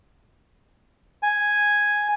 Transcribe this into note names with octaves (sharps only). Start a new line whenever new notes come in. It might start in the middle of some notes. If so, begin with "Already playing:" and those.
G#5